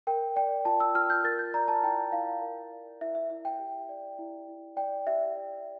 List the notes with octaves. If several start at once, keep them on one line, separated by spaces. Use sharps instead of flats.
A#4 G5
D5 G5
F4 A5
E6
F4 F6
G6
A#4 A6
G6
D5 A#5
A5
E4 G5
E4 F5
A#4
D5
E4 E5
E5
E4 E5
G5
G4
D5
E4
E4
D5 G5
G4 E5
D5